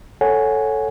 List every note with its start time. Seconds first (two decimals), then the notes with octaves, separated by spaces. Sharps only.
0.21 A4 C#5 F#5 G#5